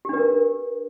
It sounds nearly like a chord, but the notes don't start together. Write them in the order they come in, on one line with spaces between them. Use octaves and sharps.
G4 D4 B4 A#4